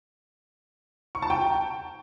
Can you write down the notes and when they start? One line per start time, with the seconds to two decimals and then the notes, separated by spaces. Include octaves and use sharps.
1.15 C#6
1.22 A5
1.30 G5